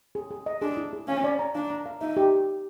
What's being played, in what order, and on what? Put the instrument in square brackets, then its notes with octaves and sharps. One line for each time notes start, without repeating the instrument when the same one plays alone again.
[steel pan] G#4
G#4
D#5
[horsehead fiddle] D4 [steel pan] G#4
[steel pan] E4
G#4
[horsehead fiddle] C#4 [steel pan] F5
[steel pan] D5
A#5
[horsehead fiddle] D4 [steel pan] F5
[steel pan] A#5
F5
[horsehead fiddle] D#4 [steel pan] E5
[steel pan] G4